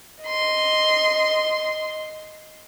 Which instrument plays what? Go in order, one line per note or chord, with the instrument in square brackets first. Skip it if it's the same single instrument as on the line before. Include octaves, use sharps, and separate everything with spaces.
[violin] D#5 C6